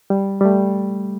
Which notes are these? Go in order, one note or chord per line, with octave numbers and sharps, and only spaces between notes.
G3
G3
A3